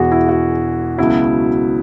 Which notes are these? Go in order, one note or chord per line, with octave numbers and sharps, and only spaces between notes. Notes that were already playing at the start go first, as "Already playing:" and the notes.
Already playing: E1 E2 E3 F#4 G#4
E4
F#4
C#2 B2 F#3 E4